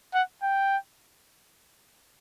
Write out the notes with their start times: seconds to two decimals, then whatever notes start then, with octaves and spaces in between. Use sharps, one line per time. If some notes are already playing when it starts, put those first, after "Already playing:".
0.14 F#5
0.43 G5